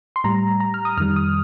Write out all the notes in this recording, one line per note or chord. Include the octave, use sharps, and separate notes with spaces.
C6
A2 G3 A#5
A#5
F6
D#6
F2 D#3 G3 F6
D#6